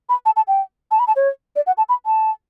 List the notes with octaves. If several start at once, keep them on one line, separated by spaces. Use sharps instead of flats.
B5
A5
A5
G5
A5
B5
A5
C#5
D5
F#5
A5
B5
A5